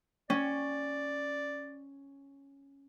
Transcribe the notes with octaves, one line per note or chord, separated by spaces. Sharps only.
C#4 D5